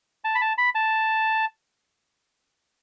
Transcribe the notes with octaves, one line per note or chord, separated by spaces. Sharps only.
A5
B5
A5
B5
A5